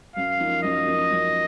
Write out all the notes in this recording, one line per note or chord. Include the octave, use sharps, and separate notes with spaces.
F#2 F5
F3 A#3 D#4
F#2 D#5
F3 A#3 D#4
F#2